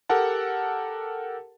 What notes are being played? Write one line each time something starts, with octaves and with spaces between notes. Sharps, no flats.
G4 A4 A#4 F#5 A5